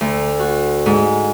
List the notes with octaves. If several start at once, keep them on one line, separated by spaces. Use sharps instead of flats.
D2
F#4
G#2